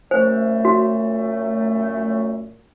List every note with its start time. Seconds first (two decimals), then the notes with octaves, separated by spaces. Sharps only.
0.11 F#2 A#2 A3 C5
0.65 F#4